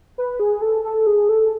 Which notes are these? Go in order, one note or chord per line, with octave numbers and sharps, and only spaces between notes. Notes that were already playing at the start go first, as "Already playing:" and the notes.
B4
G#4
A4
A4
G#4
A4